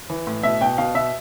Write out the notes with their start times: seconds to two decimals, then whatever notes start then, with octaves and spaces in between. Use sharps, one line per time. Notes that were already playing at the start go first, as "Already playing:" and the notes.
0.10 E3
0.27 A2
0.43 B2 E5
0.61 B2 G5
0.78 B2 F5
0.95 B2 E5